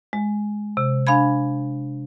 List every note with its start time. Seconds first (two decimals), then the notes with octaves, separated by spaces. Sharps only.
0.13 G#3
0.77 C3
1.07 D4 F5 G#5 B5 G#6